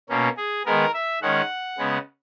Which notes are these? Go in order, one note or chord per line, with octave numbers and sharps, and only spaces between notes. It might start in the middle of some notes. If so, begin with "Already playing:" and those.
B2 A#3 C#4
G#4
D#3 G#3 B3 A#4
E5
D#3 G#3 C#4 F#5
C#3 G#3 B3